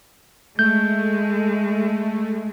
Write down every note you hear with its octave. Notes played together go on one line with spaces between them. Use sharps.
G#3 A3 G6